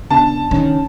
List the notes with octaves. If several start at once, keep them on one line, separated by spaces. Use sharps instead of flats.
C#3 B3 D4 A5
D#3 C#4